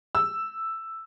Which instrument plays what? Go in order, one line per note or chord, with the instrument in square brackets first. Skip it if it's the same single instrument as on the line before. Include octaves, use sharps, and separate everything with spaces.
[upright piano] E6